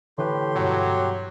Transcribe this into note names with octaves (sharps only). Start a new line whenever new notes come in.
A2 D3 E3 G4 B4 C6
G2 B2 F#3